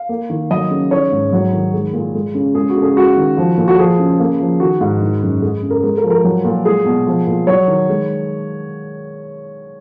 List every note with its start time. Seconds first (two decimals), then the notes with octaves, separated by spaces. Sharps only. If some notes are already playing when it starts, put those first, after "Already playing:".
Already playing: F5
0.09 A#3
0.30 D#3
0.50 F#3 D#5
0.71 C#3
0.91 D#3 C#5
1.12 G#2
1.33 F#3
1.53 D#3
1.74 G#3
1.93 A#2
2.15 G#3
2.35 C#3
2.55 G#3 G#4
2.70 F#4
2.76 C#3
2.83 G#4
2.96 G#3 F#4
3.17 D#3
3.37 F3
3.57 A#2
3.68 F#4
3.78 F3 G#4
4.00 C#3
4.20 A#3
4.40 F3
4.60 D#3 F#4
4.81 G#2
5.02 D#3
5.23 F#2
5.42 G#3 G#4
5.63 C#3
5.70 A#4
5.83 G#3 A#4
5.97 A#4
6.04 F3
6.10 A#4
6.24 F#3
6.44 A#2
6.65 G#3 G#4
6.85 B2
7.07 F3
7.27 A#2
7.47 F#3 C#5
7.68 D#3
7.89 G#3